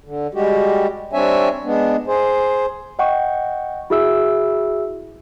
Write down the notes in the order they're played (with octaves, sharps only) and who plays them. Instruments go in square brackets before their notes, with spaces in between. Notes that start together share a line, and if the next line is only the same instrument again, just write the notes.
[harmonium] D3
G3 G#3 F#4 G4
G3 C4 D4 C#5 E5 G#5
G#3 B3 D4
G#4 C5
[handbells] D#5 F#5 G5 C#6
E4 F#4 G#4 E5 E6